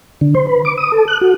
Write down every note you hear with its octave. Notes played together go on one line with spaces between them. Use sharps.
D3
C5
B4
D6
D#6
A4
F#6
F#4